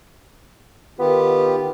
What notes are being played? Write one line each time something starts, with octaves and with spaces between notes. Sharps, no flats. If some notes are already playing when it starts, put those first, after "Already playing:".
D#3 B3 F4 G4